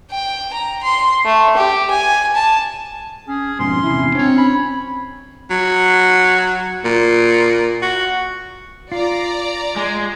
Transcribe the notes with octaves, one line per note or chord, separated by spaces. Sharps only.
G5
A#5
C6
A3
G4
G#5
A5
C#4 G#4
F2 G#2 B2 C#4 C6
E2 C3 E4
C4 D4 C#5 A#5
B5
F#3
A#2
F#4
F4 D5 A#5
G#3